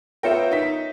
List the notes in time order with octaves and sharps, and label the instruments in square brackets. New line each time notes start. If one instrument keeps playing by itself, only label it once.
[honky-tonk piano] B3 F4 G5 [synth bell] A#4 C#5 E5
[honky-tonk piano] D#4 B6